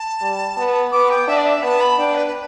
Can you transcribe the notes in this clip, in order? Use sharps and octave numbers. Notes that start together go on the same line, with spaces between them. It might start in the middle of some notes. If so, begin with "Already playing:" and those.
Already playing: A5
G3
B3
B3 D6
G5
D4 E5
D5
E5
B3 A5
B5
D4 G5
B4
B4